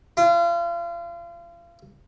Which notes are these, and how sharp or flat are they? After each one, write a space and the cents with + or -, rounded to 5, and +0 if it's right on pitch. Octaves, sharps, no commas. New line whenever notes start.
F4 -35